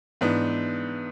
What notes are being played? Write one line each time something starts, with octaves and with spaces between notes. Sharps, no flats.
G#2 E3 B3 D4